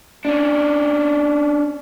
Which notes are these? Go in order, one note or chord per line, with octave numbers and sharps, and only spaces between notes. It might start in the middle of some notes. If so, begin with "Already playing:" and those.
C#4 D4